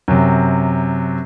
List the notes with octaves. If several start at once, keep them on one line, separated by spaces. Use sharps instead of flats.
F#2 C3